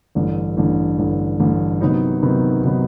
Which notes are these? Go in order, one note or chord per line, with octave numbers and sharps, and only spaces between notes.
A1 G2 D3
A1 G2 D3
A1 G2 D3
A1 G2 D3
C3 D#3 F#3 B3 D#4
C3 D#3 F#3 B3 D#4
C3 D#3 F#3 B3 D#4